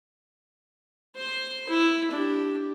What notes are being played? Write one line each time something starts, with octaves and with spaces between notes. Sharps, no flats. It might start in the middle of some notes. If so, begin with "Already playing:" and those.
C5 C6
E4
D4 G4